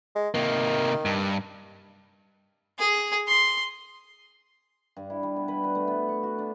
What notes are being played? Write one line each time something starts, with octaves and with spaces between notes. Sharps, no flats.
G#3
C3 D#3 A#3
G2
G#4
C6
G2
E4
G3
B2
B4
B4
A3
B3
C#6
F#4
D4